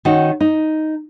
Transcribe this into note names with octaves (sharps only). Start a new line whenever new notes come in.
D#3 C#4 D#4 F#4
D#4